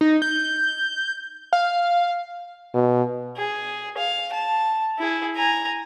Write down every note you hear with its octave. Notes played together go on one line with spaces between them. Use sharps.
D#4
G6
F5
B2
G#4
F5
A5
E4 G#4
G#5 A#5